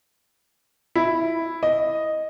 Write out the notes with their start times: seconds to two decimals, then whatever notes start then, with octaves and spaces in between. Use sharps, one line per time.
0.95 E4
1.63 D#5